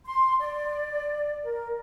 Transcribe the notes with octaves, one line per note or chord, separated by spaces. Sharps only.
C6
D5
A#4